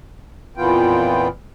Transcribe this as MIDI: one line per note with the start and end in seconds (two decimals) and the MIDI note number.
0.57 1.28 41
0.57 1.28 46
0.57 1.28 52
0.57 1.28 59
0.57 1.28 65
0.57 1.28 79